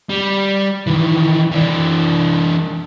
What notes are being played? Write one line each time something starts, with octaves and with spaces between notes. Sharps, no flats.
G3
D#3 E3
E3 D4